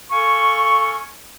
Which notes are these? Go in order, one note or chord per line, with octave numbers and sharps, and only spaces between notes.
A4 F5 G#5 C#6